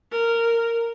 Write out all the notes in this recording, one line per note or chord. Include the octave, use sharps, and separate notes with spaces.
A#4